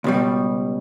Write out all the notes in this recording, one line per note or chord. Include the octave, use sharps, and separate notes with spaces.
C#2 B2 G3